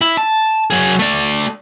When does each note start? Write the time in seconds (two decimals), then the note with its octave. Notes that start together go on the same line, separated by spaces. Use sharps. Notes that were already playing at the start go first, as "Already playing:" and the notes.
0.01 E4
0.17 A5
0.70 F#3 G#4
0.99 A3 D5